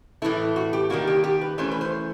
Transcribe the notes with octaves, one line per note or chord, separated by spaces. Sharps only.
A2 E3 A3 E4
F#4
G4
D#3 G3 A#3 F#4
G4
G4
B4
E3 A3 C#4 C5
B4
C5